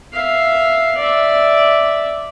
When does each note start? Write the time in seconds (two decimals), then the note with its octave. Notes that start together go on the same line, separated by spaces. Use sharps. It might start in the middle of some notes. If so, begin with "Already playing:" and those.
0.13 E5 F5
0.97 D5 E5